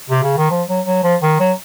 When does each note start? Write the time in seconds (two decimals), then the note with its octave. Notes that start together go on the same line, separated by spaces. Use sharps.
0.10 C3
0.23 C#3
0.37 D#3
0.50 F3
0.68 F#3
0.86 F#3
1.03 F3
1.22 D#3
1.40 F#3